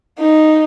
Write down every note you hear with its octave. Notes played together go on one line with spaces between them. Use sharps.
D#4